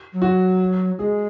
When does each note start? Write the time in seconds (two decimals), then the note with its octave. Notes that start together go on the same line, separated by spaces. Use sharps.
0.13 F#3
0.22 F#4
0.99 G#3 G#4